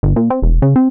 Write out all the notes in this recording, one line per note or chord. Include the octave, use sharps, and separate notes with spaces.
G1
A#2
C4
E1
C#3
C4